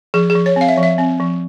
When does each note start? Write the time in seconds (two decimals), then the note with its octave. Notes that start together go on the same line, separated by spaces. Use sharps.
0.14 F3 G#4
0.30 F3 G#4
0.46 C#5
0.56 C4 F5
0.68 E5
0.76 F3 C#5
0.83 E5
0.98 C4
1.20 F3